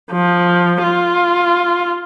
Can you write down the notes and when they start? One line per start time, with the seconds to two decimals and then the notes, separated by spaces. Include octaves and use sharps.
0.12 F3
0.83 F4